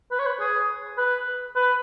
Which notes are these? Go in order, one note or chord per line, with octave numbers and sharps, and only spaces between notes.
B4
C#5
B4
G#4
B4
B4